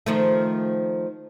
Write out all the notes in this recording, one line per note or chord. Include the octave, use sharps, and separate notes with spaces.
D#3 F3 A3